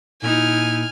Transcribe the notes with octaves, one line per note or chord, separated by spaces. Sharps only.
A#2 D#4 E4 G#5 F6